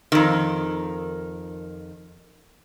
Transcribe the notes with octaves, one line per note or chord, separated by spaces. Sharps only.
F2 D#3